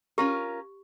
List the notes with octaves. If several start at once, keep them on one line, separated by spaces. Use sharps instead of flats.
C#4 F4 G4 A#4